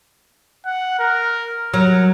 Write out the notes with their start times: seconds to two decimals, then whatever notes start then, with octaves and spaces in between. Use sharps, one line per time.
0.66 F#5
0.99 A#4
1.74 F#3 A#4